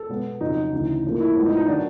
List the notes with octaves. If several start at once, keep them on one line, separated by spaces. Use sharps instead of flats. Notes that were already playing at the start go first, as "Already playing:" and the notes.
Already playing: A4
B2 G#3 B3
F2 C#3 F#3 D#4
D2 C#3 E3
A2 F3 A#3
E4
A2 F3 G#3 B3
D#4
D#4
D#3 F#3 D4